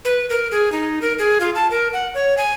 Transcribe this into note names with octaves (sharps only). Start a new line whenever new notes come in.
B4
A#4
G#4
D#4
A#4
G#4
F4
A5
A#4
F#5
C#5
G#5